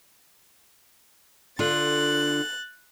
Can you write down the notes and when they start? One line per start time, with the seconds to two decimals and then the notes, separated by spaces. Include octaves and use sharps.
1.59 D3 F4 F#6 A6